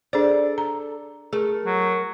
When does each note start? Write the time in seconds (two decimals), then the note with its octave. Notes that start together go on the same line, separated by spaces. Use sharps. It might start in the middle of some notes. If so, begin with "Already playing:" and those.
0.13 D4 G#4 A4 C5 D5
0.58 A#5
1.33 A3 G#4 A#4
1.65 F#3